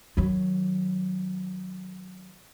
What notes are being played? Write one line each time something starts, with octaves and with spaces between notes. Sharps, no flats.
D#3 F#3